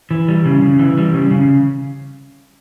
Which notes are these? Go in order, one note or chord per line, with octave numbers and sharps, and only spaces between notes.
E3
G3
C#3
C#3
E3
G3
C#3
C#3